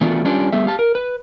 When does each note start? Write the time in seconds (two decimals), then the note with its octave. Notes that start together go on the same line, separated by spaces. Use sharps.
0.01 E3 A3 B3 D4 F4 F#4
0.24 G3 C#4 D4 F4 G4
0.53 G3 A3 B3 G#4 E5
0.66 G4 F5 A5
0.79 A#4
0.95 B4